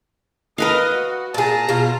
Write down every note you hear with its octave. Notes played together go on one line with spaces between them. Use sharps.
A#4 B4 D#5 F5
F#4
A#2 G#4 A5 A#5
B2 F4